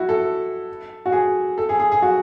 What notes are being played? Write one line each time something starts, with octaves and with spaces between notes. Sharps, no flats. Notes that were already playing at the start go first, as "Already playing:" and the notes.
Already playing: E4 F#4
A4
F#4
G#4
A4
G#4
G#4
G#4
F#4